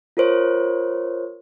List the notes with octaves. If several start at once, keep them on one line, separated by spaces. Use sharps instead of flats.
F4 A#4 C5 C#5